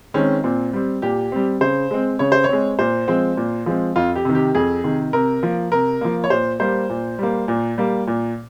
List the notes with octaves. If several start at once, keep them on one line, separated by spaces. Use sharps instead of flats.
D#3 G#3 C4 C#4
A#2 C4
G3 C4
A#2 G4
G3 C4
C#3 C5
G#3 C4
C#3 C#5
C5
C#5
G#3 C4
A#2 C5
F3 G#3 C4
A#2
F3 G#3 C4
F2 F4
G4
C3 D#3
G4
F2 G#4
C3 D#3
C3 A#4
F3 A#3
C3 A#4
F3 A#3
C#5
A#2 C5
G3 A#3 C5
A#2
G3 A#3
A#2
G3 A#3
A#2